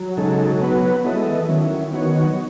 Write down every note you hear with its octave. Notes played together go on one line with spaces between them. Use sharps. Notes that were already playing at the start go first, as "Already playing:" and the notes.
Already playing: F#3
C#3 G#3 D#4 A4
B3 F#4 B4
F#3 B3 E4 A4 D#5
G#3
E3
E3
D#3 F#3 C#4 E4
E3 B3 D#4 F#4 C#5
D#3
D#3
F#3